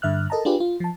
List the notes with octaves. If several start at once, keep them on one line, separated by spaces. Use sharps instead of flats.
G2 D3 E5 F6 F#6
A4 A#4 D#5 A5 A#5
D4 F4 G4 G#4 B4
F4
F3 A5